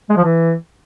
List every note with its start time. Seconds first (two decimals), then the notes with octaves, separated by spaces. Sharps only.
0.10 G#3
0.17 F3
0.24 E3